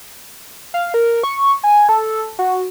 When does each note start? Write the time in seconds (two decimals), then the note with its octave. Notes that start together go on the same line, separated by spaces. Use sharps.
0.74 F5
0.94 A#4
1.23 C#6
1.64 G#5
1.89 A4
2.39 F#4